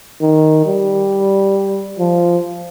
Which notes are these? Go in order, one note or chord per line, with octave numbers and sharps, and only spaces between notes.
D#3
G3
F3